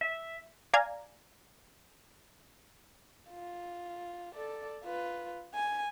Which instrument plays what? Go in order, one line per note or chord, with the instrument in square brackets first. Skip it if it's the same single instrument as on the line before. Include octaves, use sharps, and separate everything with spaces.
[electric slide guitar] E5
[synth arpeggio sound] D5 F5 G#5 A#5 G#6
[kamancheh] F4
A4 D5
F4 B4
G#5